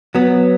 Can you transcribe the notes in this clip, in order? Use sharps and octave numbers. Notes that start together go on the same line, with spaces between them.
F#3 B3